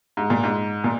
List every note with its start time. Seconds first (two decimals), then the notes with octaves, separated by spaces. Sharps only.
0.17 G#2
0.30 A#2
0.43 G#2
0.84 A#2